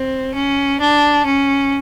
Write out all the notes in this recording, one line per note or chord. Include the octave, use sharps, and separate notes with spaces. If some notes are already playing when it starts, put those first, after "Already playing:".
Already playing: C4
C#4
D4
C#4